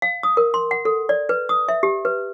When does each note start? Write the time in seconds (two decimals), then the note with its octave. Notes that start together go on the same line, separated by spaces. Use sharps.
0.02 F5
0.23 D#6
0.37 A#4
0.54 C6
0.71 F#5
0.85 A4
1.09 D5
1.29 B4
1.49 D#6
1.69 E5
1.83 G4
2.05 B4